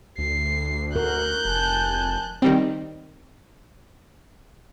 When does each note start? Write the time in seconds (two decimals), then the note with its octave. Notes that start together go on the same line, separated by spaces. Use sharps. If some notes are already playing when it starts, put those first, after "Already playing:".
0.18 D2 C7
0.96 F#4 A#4 F#6 G6
1.45 F1 G#5 A5
2.42 D#3 G3 C4